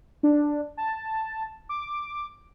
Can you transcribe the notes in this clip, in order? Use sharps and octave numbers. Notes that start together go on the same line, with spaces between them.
D4
A5
D6